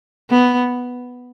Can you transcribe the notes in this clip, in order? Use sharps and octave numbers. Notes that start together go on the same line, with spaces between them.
B3